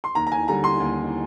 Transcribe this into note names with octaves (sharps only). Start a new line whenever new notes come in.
C6
D#2 A#5
A#5
G#5
D3 G3 A#5
C6
D#2